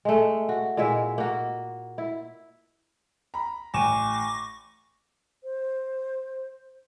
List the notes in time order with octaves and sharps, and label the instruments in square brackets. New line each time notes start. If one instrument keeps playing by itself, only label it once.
[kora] G#3 A3
F#4
A#2 G#3 E4 E5
A#3 F#4
E4
[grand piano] A#5 B5
[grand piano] A1 E7 [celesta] G#5 D#7 [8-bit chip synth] C#6 D6 A#6
[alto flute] C5